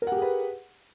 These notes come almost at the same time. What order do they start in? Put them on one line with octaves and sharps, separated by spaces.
A#4 F#5 G4 G#4 B4